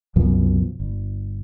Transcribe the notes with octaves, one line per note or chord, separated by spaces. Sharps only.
C2 F#2 B2 F3
G1